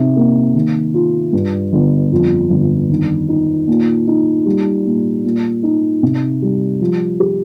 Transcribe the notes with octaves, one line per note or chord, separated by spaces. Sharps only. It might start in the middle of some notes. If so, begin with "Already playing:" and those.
Already playing: C3 D#4
A#3
D#3
F4
G2
G1
F2
G1
D#3
D#4
A#2
D#4
G3
A#2
A#2
D#4
C3
G3
F3
G4